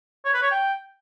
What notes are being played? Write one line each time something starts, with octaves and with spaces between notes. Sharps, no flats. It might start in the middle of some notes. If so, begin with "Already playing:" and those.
C#5
B4
C#5
G5